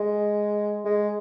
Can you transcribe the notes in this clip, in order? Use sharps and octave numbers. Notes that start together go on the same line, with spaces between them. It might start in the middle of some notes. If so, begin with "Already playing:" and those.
Already playing: G#3
G#3